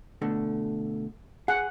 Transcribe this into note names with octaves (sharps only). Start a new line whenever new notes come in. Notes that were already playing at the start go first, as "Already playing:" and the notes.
B2 D3 A3
G#4 F#5